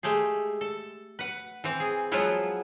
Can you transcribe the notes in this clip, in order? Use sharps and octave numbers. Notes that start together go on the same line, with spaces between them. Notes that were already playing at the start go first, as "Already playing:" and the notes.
G#3 A3 G4 G#4
A4
B4 F#5
E3 C4
G#4
F3 F#3 G#3 B3 E4 F4